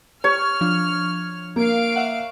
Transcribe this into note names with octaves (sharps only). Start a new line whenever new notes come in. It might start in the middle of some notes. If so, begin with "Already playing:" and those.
G4 C#5 F6
F3 D4
A#3 F5 D7
E5 F#5